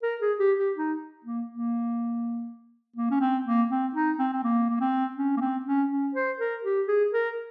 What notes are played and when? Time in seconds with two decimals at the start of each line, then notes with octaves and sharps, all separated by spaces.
0.03 A#4
0.21 G#4
0.39 G4
0.58 G4
0.76 D#4
1.25 A#3
1.50 A#3
2.96 A#3
3.11 C#4
3.21 C4
3.46 A#3
3.70 C4
3.95 D#4
4.19 C4
4.33 C4
4.43 A#3
4.70 A#3
4.80 C4
5.17 C#4
5.37 A#3
5.41 C4
5.66 C#4
5.90 C#4
6.15 C5
6.39 A#4
6.64 G4
6.88 G#4
7.13 A#4